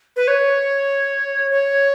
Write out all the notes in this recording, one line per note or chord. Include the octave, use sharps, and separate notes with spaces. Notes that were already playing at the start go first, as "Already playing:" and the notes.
B4
C#5
C#5